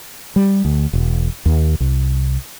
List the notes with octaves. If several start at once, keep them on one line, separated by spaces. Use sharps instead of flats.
G3
D2
E1
D#2
C2